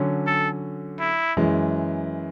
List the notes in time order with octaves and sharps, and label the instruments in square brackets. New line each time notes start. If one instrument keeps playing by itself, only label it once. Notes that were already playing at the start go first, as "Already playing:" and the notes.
Already playing: [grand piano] D3 F#3 C#4
[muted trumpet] A4
E4
[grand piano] F#2 E3 G#3